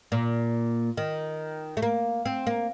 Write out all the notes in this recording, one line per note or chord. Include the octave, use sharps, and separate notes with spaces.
A#2
D#3
A3
A#3
C4
A#3